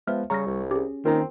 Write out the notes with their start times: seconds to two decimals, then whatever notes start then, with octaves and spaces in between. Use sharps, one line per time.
0.07 F3 G#3 B3 B4 E5 F6
0.30 C#3 G3 A#5 C#6 F6 A#6
0.47 C2
0.71 C#4 G4 G#4
1.05 D#3 A#3 C4 C#4 F4 A#4 A#5